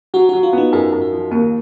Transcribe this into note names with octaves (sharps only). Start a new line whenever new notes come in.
F#3 F#4
F#3 F#4
F4
B3 D#4
F#2 G#4
F#2
F#4
F3
D#2 A#3